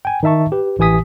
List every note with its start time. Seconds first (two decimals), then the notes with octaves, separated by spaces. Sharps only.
0.05 G5 G#5
0.23 D#3 D#4 E5 A5 C#6
0.52 G4 B4
0.79 A1 E3 G4 G#5 D#6 B6